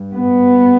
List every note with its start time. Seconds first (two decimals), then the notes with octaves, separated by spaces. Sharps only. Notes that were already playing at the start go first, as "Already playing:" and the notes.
Already playing: G2
0.13 B3